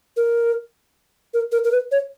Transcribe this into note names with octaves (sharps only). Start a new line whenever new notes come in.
A#4
A#4
A#4
A#4
B4
C#5